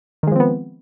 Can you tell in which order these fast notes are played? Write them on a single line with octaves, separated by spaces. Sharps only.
D#3 G#3 F3 C4 B3